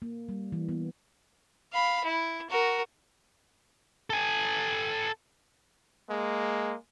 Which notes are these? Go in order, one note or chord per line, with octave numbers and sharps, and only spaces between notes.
A#3
G3
E3
B3
F5 B5
E4
F#4 A#4
A4 G#5
G#3 A#3